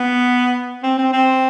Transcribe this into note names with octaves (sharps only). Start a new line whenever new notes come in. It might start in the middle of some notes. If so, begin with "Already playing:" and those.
Already playing: B3
C4
C4
C4